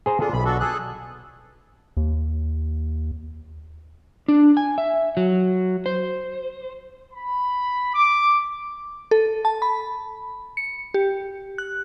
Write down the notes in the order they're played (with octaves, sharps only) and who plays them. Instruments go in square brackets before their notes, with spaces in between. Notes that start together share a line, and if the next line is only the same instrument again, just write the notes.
[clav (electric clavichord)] G#4 C5 A#5
[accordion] D4 F4 [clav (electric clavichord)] G#4 A4
[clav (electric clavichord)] B1 [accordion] C3 B5
[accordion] D4 F#4 A4
G#4 A4 F#6
[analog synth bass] D#2
[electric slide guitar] D4
G#5
E5
F#3
C5
[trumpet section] B5
D6
[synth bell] A4
A5
B5
C#7
G4
F#6